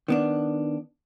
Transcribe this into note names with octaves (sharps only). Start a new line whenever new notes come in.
D#3 B3 D4